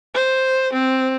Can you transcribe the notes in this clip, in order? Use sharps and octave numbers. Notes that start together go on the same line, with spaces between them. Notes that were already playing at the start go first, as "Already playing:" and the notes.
C5
C4